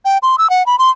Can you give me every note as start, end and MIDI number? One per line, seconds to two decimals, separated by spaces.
0.05 0.18 79
0.23 0.36 84
0.38 0.49 88
0.50 0.65 78
0.66 0.78 83
0.79 0.90 84